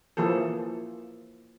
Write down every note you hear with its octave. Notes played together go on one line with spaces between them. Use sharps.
E3 F3 A#3 G#4 A4